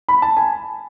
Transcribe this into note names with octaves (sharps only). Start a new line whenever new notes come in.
B5
A5
G#5